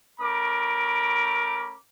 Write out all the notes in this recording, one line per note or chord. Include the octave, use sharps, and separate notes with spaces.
A3 C#4 A#4 B5 D6